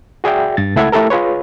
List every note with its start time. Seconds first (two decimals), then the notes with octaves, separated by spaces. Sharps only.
0.24 F#4 G#4 D5 E5 G5
0.57 G2 A6
0.76 C#2 A3 E4 A4 F#5 G#6
0.92 A3 E4 G4 A4 A#4
1.10 F4 G#4 B4 C#5